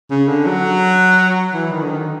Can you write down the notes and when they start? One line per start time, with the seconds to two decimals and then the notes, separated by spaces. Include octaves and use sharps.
0.10 C#3
0.28 D3
0.46 F#3
1.54 E3
1.72 D#3
1.82 D3
1.90 D#3